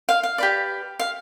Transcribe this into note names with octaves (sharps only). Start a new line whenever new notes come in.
F5
F5
G4 B4 D5
F5